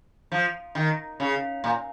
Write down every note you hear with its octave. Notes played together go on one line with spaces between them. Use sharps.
F3
D#3
C#3
A#2